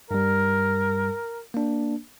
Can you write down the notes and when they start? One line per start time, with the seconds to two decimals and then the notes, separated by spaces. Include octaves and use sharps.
0.11 G2 G3 A#4
1.54 A#3 D4